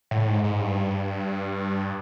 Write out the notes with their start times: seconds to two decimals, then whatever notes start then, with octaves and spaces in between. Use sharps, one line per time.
0.11 A2
0.28 G#2
0.44 G#2
0.60 G2